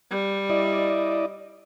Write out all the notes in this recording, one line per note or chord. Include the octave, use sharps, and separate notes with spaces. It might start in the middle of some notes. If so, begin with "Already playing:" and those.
G3
E4 D5 D#5